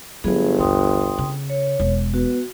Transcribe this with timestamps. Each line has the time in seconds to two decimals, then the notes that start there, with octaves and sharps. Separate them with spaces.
0.24 G1 F#3 A3 B3 G#4
0.59 A#1 E2 G5 C6 D#6
1.18 C#3
1.50 C#5
1.80 E1
2.14 B3 F#4